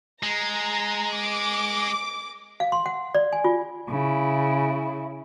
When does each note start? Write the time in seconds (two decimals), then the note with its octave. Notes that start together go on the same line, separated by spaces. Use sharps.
0.23 G#3 A#5
1.16 D6
2.60 F5
2.72 C6
2.86 F#5
3.15 D5
3.33 G#5
3.44 F4
3.89 C#3 E4